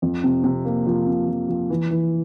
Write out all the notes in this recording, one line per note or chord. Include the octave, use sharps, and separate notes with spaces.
F2
C3
C3
A#3
F3
C3
F3
F3
E3
E3